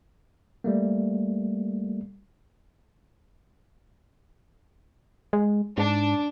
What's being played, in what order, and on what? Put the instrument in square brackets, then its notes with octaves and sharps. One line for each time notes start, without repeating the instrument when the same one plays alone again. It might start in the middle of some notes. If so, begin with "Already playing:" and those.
[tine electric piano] G3 A3 A#3
[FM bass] G#3
[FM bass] G#2 [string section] D4